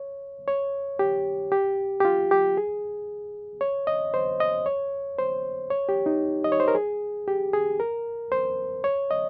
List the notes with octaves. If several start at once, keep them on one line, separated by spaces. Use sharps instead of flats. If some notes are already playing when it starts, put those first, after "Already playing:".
Already playing: C#5
C#5
G4
G4
G4
F4
G4
G#4
C#5
D#5
C5
D#5
C#5
C5
C#5
G4
D#4
D#5
C#5
C5
A#4
G#4
G4
G#4
A#4
C5
C#5
D#5